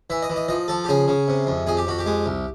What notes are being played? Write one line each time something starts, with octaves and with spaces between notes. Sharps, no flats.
E3 E5
D#5
E3
D#5
F3 D#5
F3 A4
G4
C#3 G#4
C#3
C3
F2
F2 G#4
G4
F2 F#4
G4
G#3
C2